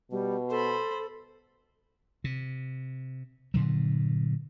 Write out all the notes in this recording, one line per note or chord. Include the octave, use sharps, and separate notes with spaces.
B2 G3
A4 C5 B5
C3
G2 A#2 D3 F#3